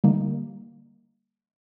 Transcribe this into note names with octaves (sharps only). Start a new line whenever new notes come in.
D3 G3 A#3 D#4